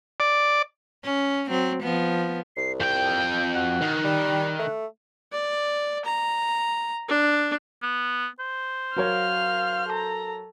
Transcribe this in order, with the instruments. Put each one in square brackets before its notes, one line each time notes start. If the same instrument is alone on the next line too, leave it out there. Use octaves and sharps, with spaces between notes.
[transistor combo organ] D5
[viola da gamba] C#4
F#3 C4
F3 B3
[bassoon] C2 [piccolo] C7
[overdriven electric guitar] F2 G5 [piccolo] G6
[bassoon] F#4 [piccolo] F#6
[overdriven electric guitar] D#3
[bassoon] G3
A3
[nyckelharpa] D5
A#5
D4
[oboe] B3
C5
[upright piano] F#3 A#4 C#5 [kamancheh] F5 F6
[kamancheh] A4 A#5